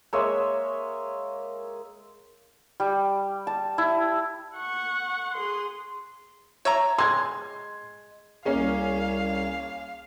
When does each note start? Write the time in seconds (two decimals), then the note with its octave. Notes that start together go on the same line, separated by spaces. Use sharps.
0.13 G#3 A#3 C#5 E5
2.80 G3
3.47 A5
3.78 E4
4.55 F#5 C#6
5.34 G#4 C6
6.65 C#5 E5 A#5
6.98 G#3 C6 G#6
8.45 C2 A#3 C#4 G#4 F5